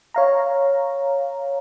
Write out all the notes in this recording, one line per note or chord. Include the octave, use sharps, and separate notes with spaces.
C#5 F5 A#5